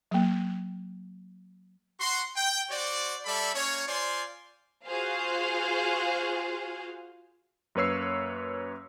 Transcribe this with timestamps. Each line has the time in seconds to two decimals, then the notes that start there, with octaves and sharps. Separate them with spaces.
0.11 F#3 A#3
2.00 F#4 C6
2.36 G5
2.70 F#4 C5 D5
3.25 G3 A4 D5 E5 B5
3.54 A#3 C#4 C#5
3.86 F4 C5 D5 G#5 C6
4.86 F4 F#4 G#4 C5 F5
7.75 F#2 A#3 B4 C#5 E6 C7